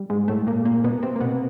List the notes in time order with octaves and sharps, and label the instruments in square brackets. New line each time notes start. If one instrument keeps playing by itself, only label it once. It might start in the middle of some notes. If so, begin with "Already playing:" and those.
Already playing: [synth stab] G3
G#2 G#3
A2 A3
A#2 A#3
A#2 A#3
B2 B3
C3 C4
A#3
B2 B3